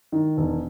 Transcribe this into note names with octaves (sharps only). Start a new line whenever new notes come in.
D#3
E1